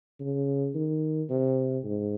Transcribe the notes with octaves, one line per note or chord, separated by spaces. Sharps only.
C#3
D#3
C3
G#2